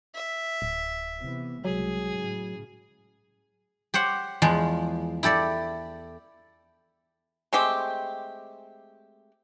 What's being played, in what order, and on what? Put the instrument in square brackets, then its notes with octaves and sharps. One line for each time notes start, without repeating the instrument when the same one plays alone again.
[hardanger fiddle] E5
[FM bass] D1
[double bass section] C3 E3 B3
[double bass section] C2 C#3 G#3 [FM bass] F#3 [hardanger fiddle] G#4
[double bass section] A2 C#3
[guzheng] G4 C5 C#5 F#5
E2 F3 G#3
E4 G4 A4 D5
[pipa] G#3 A3 C4 G4